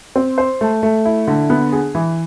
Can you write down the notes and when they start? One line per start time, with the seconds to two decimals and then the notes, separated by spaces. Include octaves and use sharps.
0.16 C4
0.38 C5
0.61 A3
0.83 A3
1.05 E4
1.27 D3
1.50 B3
1.72 G#4
1.95 E3